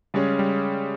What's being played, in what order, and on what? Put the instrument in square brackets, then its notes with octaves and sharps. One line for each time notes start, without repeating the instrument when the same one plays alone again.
[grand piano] C#3 G#3 C#4 G#4 [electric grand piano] G3
[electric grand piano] G3